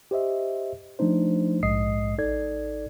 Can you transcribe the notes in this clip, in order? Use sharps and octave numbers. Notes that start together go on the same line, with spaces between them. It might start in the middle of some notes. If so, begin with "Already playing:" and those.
G4 C5 D#5 E5
F3 A3 D4 D#4 C5
A#1 G#2 G#3 D#5 D#6 C7
A1 D#4 A4 D5 G#6